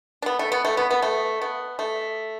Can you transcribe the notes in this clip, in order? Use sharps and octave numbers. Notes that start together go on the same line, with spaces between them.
D4
B3
A3
B3
A3
B3
B3
A3
B3
A3